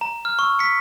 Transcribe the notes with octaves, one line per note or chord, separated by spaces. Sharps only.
A#5
F6
C#6 E6
B6 C#7